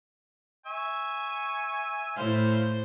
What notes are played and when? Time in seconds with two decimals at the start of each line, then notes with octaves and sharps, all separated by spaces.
0.66 E5 G#5 C#6
2.17 A2 E4 C5 F5